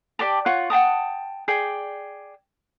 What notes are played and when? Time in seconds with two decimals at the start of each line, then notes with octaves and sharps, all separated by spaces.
0.19 G4 D5 G5 A5
0.46 F4 C#5 F#5 C#6
0.70 F#5 G5 A5 D#6
1.48 G#4 D5 G5